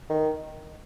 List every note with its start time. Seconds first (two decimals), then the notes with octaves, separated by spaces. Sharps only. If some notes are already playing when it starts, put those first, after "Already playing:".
0.10 D#3